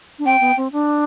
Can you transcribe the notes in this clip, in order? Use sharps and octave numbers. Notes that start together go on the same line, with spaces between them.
D4
C4 G5
B3
C4
D4